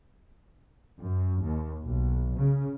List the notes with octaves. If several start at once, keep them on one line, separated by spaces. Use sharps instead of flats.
F#2
D#2
B1
C#3